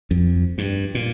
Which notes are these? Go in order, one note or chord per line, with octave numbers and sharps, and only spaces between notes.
F2
G2
A#2